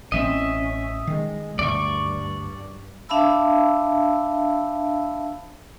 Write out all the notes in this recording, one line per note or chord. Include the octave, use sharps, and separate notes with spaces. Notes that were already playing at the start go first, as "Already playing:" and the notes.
A1 E3 C4 C#4 D#5 E5
D#3 G#3
D2 G2 D5 C#6
D4 E5 F5 A5 B5 E6